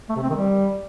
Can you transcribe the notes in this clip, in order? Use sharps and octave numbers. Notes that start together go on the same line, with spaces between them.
A3
C3
C4
D#3
G3